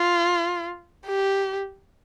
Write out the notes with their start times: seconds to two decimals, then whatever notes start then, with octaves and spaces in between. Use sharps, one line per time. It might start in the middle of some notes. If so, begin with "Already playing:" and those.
Already playing: F4
1.06 G4